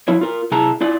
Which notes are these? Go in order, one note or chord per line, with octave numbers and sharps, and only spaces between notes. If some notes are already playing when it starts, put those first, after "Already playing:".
F3 E4 C#5
F4 A#4
C3 E4 G#4 A5 A#5
E4 F4 D5